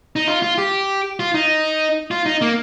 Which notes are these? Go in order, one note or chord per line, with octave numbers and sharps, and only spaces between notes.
D#4
F4
F4
G4
F4
D#4
F4
D#4
A#3